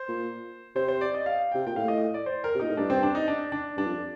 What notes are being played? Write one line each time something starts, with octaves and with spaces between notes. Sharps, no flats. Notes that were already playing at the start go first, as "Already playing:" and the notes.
Already playing: C5
A#2
C3 C5
C5
D5
D#5
F5
C3 G5
A#2 G5
A2 F5
D#5
D5
C5
A#4
C3
A#2 D#4
A2
G2 D4
C4
D4
D#4
D4
D4
G2 D4
F2